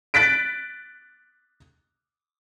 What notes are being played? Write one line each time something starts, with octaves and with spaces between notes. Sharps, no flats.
F#6 A6 B6 D7